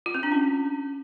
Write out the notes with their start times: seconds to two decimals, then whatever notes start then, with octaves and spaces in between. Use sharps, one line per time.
0.06 F4
0.15 C4
0.23 D4
0.32 C#4